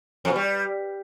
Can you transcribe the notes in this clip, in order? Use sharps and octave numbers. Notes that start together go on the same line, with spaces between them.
F2
B2
G3